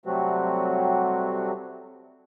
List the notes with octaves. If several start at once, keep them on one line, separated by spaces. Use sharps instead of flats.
C3 F#3 G3 A3 C4 F#4